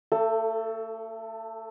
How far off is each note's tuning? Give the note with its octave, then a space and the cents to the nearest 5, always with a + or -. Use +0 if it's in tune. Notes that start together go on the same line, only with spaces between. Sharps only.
A3 +35 A4 +0